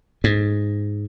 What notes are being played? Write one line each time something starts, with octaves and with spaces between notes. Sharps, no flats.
G#2